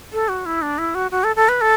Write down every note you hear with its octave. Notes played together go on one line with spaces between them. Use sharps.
A4
F#4
E4
D4
E4
F#4
F#4
A4
A4
B4
A4